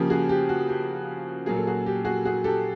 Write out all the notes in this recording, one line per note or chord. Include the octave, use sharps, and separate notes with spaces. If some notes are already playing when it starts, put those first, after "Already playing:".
Already playing: C#3 F3 A#3 G4
F#4 G#4
G4
F#4
G4
A#2 F#3 A#3 G#4
A4
F#4 G#4
G4
F#4 G#4
F#4 G#4
G4 A4